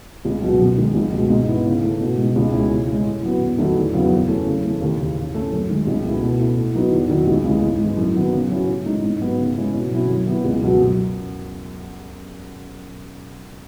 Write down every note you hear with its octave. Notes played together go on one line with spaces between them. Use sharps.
C#2
B2 F#3
F#2
D#3 G#3
C#2
B2 G#3
G#2
E3 B3 E4
C#3
E3 A3 C#4 E4
B2
G#3 D#4
C#2
B2 G#3 C#4 E4
C#3
G#3 C#4
A2
F#3 B3
E2
D#3 F#3 A3 E4
E2
C#3 F#3 B3
F#2
E3 A3 C#4
C#3
E3 A3
D#2
C#3 E3
A2
E3 A3 C#4
F#2
D#3 G#3
C#2
B2 A3 E4
B2
A3 E4
A2
F#3 B3 D#4
E2
D#3 F#3
C#2
C#3 E3 G#3
G#2
E3 G#3
F#2
D#3 F#3 B3
C#3
F#3 C#4 E4
A2
G#3 D#4
G#2
F#3 B3
C#3
G#3 C#4 E4
B2
F#3 C#4 E4
F#2
E3 B3 E4
C#2
B2 F#3
F#2